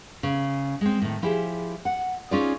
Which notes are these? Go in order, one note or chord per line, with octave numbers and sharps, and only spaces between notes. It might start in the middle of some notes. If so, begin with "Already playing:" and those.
C#3
G#3 C4
A2 D#3
F3 E4 G4 G#4
F#5
C#4 D#4 F4 G#4 D5